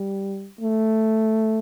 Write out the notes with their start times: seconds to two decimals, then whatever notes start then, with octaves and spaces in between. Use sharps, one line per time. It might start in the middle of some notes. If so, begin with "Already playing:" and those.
Already playing: G3
0.61 A3